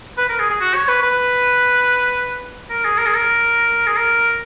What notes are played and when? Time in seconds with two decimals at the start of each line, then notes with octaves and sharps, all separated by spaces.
0.18 B4
0.29 A#4
0.40 G#4
0.50 G#4
0.61 F#4
0.74 C#5
0.88 B4
1.03 B4
2.70 A#4
2.85 G#4
2.98 A#4
3.06 G#4
3.15 A#4
3.87 G#4
3.97 A#4